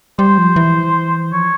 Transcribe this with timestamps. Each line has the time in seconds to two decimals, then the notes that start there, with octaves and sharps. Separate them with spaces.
0.19 G3 C5
0.38 F3
0.56 E3
1.32 F3 C#5